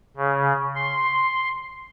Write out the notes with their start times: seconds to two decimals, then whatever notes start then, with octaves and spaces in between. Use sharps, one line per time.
0.17 C#3
0.75 C6